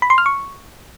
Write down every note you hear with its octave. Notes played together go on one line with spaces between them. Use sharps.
B5
C6
F6
C#6